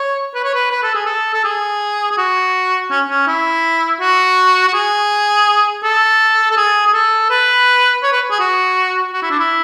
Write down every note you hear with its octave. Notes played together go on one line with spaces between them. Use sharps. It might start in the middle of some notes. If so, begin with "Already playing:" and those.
Already playing: C#5
B4
C#5
B4
B4
A4
G#4
A4
A4
G#4
G#4
F#4
C#4
C#4
E4
F#4
F#4
G#4
A4
A4
G#4
G#4
A4
B4
C#5
B4
G#4
F#4
F#4
E4
D4
E4